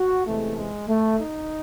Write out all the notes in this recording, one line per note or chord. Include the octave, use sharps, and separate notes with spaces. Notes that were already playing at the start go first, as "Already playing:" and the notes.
Already playing: F#4
E2 C3 E3 G#3 A3
G#3
A3
D#4